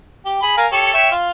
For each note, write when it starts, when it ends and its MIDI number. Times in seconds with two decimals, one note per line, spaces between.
0.25 0.38 67
0.42 0.55 68
0.42 0.55 83
0.57 0.67 70
0.57 0.67 77
0.57 0.67 80
0.72 0.93 67
0.72 0.93 69
0.72 0.93 73
0.94 1.09 73
0.94 1.09 76
0.94 1.09 79
1.12 1.31 65